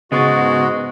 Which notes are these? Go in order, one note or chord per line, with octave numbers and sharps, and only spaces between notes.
G#2 C#3 G#3 B3 F#4 C#6 A6